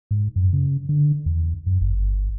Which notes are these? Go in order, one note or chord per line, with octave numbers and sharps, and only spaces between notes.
G#2
F#2
C#3
D3
E2
F#2
G1